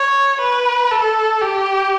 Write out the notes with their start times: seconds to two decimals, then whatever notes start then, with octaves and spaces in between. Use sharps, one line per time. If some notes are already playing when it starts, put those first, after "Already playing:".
Already playing: C#5
0.41 B4
0.91 A4
1.41 G4